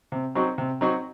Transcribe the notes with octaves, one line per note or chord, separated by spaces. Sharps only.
C3
F#3 C4 D#4 F#4
C3
F#3 C4 D#4 F#4